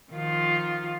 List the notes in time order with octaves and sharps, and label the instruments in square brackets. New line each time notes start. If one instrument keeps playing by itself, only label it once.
[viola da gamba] D#3 F3 F4